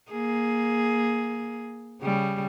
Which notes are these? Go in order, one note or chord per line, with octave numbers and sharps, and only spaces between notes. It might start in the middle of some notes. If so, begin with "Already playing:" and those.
A#3 G#4
C#3 G3